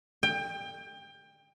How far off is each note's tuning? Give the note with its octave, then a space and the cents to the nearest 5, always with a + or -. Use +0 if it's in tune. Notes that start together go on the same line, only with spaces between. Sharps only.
G5 +25